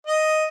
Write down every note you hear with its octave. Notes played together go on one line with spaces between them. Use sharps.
D#5